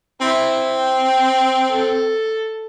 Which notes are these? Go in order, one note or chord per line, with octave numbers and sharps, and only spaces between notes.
C4 E4
G5
A4